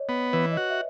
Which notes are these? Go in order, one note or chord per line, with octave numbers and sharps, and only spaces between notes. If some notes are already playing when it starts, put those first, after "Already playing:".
Already playing: C#5 D#5
B3
E3 B4
D#5
F#4
E5